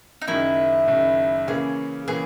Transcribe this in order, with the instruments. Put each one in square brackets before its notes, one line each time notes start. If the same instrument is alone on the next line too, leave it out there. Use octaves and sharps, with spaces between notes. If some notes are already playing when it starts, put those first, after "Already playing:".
[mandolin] D#4
[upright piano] F#1 F#2 D#3 [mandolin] E4
[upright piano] F#1 F#2 D#3
[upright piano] C#3 E3 A#3 C#4 [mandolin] G#4
[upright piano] C#3 E3 A#3 C#4 [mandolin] G#4